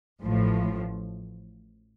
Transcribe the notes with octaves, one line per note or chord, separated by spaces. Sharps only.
A1 A2 F3